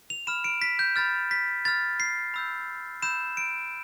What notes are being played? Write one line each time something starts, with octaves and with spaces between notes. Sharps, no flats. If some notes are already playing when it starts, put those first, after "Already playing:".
F7
B5 F6 E7
D7
B6
G6
B5 F6 A6
B6
B5 F6 A6
C7
B5 E6 G6
B5 E6 G6 E7
D7